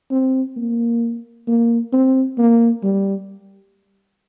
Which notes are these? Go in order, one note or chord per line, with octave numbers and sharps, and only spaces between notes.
C4
A#3
A#3
C4
A#3
G3